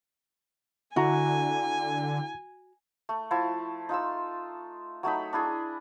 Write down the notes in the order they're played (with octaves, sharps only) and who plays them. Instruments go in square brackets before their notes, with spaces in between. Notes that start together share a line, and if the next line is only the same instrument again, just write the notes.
[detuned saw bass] D3 [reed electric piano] E4 F#5 A#5 [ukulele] F#4 [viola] G#5
[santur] A3
F3 E4 A5
D#4 F4 C6 E6
F#3 A3 D#4 B5
D4 E4 G#4